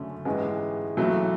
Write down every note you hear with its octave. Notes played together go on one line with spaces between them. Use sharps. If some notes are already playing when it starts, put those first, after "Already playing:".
Already playing: F#1 F#2 D3 A3 C#4
A1 G#2 E3 G#3 B3
B1 A2 E3 F#3 A3